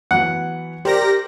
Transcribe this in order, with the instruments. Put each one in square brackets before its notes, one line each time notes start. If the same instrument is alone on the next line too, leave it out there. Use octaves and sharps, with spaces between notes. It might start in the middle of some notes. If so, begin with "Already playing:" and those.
[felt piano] E3 F#3 B3 [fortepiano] F#5
[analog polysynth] G4 A#4 A#6 [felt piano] C5 D5 C6